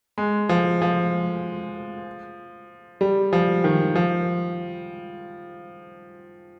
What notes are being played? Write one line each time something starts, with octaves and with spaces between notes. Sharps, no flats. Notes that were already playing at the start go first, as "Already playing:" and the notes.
G#3
F3
F3
G3
F3
D#3
F3